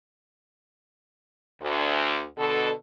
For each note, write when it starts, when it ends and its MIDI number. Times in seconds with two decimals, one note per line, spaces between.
1.62 2.24 38
2.38 2.71 47
2.38 2.71 50
2.38 2.71 69